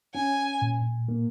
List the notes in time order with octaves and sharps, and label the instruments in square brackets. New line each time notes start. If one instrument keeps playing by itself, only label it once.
[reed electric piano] C#4 [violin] G#5
[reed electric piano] A#2
A#3